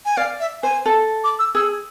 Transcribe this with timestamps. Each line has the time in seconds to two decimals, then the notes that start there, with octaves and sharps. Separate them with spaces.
0.05 G#5
0.17 D5 F5
0.40 E5
0.63 C5 G#5
0.86 A4
1.24 D6
1.39 E6
1.55 G#4 E6